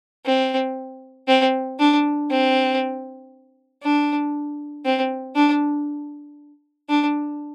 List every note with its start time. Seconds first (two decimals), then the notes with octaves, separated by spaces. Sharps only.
0.25 C4
1.28 C4
1.79 D4
2.30 C4
3.83 D4
4.85 C4
5.35 D4
6.89 D4